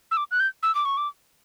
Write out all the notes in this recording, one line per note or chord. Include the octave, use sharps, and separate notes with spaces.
E6
D6
F#6
G6
E6
D6
C#6
D6